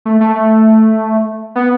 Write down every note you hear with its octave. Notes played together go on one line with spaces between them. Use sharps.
A3
A3
A3
B3